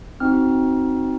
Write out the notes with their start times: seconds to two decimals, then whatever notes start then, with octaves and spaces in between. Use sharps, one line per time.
0.20 C4 D#4 F#4 F6